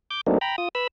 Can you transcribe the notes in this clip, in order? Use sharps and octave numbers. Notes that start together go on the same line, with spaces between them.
D6 G6
F#3 A3 A#3 C4 D4 D#4
G5 A#5 B5
F4 D#6
B4 B5 E6